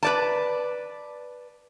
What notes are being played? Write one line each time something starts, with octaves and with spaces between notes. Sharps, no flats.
B4 D5 A5